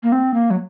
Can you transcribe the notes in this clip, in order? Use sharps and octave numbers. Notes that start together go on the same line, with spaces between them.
A#3
C4
A#3
F#3